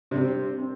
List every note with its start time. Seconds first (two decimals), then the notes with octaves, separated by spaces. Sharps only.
0.11 C3 G3 C4 D4
0.58 C4